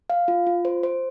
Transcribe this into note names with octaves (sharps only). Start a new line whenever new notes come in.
F5
F4
F4
C5
C5